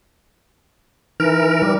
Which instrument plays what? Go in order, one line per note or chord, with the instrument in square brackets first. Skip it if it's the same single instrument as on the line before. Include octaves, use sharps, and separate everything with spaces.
[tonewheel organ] E3 A#4 [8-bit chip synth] D#4
[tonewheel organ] G3